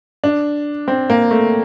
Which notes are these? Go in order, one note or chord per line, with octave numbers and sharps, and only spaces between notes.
D4
C4
A#3
A3